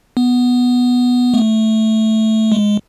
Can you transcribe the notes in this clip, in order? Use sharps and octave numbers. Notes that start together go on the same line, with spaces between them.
B3
A3
G#3